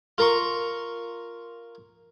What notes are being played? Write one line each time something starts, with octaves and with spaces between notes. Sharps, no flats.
F4 A#4 A#5 C6 C#6